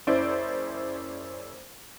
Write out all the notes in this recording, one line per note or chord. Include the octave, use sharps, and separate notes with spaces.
F#1 C#4 E4 C5 D5 D7